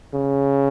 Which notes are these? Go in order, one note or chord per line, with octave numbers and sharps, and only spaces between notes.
C#3